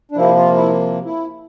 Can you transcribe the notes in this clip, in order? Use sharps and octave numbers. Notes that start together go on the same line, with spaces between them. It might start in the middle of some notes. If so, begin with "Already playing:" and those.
D4
C3 F3 A#3 E4
F4
E4
E4